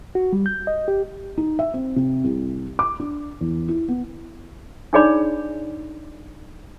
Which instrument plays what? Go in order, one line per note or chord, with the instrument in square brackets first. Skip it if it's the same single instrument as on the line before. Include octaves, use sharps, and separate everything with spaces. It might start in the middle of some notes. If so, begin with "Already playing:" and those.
[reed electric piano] F#4
G3
G6
D#5
G4
[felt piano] D#4
E5
C4
C3
C2
D6
D4
E2
E4
B3
[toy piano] D4 D#4 G#4 C#5 D5 B5